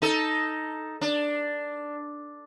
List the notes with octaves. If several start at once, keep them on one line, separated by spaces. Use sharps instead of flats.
D#4 A4
D4